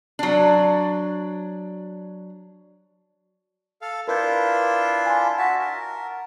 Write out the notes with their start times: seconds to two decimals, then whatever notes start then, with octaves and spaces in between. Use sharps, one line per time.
0.19 F#3 D4
3.81 A4 F5
4.08 D4 E4 F4 A#4 B4 G6
5.06 G#5 A5 C6
5.38 F#4 E5 F#5 A5
5.59 A#4